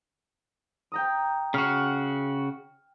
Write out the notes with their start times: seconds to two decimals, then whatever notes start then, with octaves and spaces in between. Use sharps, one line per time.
0.92 G5 A#5 D#6
1.54 C#3 F#4 F6 D#7